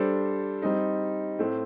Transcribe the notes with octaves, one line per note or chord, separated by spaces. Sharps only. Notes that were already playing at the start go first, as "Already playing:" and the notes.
Already playing: G3 D4 A4 C5
G3 C4 D#4
A2 A3 C4